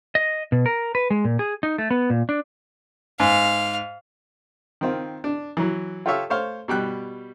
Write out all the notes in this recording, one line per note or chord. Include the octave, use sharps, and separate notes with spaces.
D#5
B2
A#4
B4
G#3
A#2
G#4
D#4
A3
B3
A#2
D4
G#2 F5
D#3 C4 F4
D4
E3 F#3
F4 G4 A4 C#5 E5 F5
A3 C5 C#5 F5
B2 G3 G5 F#6